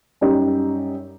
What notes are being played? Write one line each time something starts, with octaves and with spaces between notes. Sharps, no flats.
F#2 G3 D#4 G4